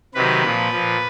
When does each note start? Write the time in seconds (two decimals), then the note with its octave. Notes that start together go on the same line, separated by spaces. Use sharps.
0.14 C3 D#3 F#3 B4
0.43 A#2 F3
0.72 A#2 F3